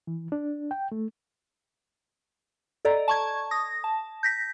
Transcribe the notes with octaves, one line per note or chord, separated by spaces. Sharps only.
E3
D4
G5
A3
A4 D5 D#5 A#5
A5 C#6 G#6
D#6 A#6
A5
G6 A#6 B6